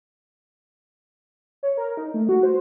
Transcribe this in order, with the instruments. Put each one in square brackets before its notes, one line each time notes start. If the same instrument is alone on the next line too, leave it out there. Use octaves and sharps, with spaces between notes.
[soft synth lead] C#5
A#4
D#4
A3
F#4
C5